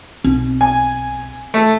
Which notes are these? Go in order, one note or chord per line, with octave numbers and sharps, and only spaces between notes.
B1 C4
G#5
A3